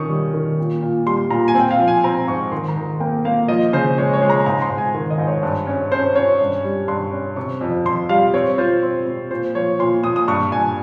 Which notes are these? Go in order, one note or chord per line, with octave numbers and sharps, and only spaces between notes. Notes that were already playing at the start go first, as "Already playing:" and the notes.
Already playing: D#3 C#4 C#6 D#6
G3
D#3
A#2
A#2
G3 C6
A#2 A#5
G#5
C4 G5
F5
F3
G#5
C4 A#5
G#2 C#6
D#3 C6
A#5
D#3
A#3 G5
A#3 F5
F3 D#5
C#3 C5
G#3 C#5
C#5
G#3
A#5
G#2 A#5
C6
G#2
G#5
D#3
D#5
G#2
C#5
G2
C#4
C#4 C5
C#4 C#5
G2
G3
G2 C6
C#4
C3 C#6
F2
F2 C6
G3 F5
C4 C#5
F4 C5
C4
C4
A#2 C5
F3 C#5
A#2 C6
A#2 D#6
D#6
G2 C#6
G2 G#5